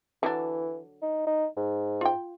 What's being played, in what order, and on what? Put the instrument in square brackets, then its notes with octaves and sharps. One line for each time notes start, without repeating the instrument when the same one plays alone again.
[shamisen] D3 F#3 D4 [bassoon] E3
[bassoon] D#4
D#4
G#2
[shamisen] F4 G5